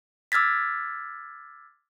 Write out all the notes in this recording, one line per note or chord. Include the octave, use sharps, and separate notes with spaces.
D6 E6 F6 G#6 A6 B6